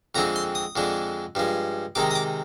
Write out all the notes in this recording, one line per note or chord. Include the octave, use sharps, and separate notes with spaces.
F2 D3 G#3 C4 A#5
C6
D#6
F2 D3 G#3 D4
G2 F3 G#3
C3 D#3 G#3 D#4 D6
D#6
D6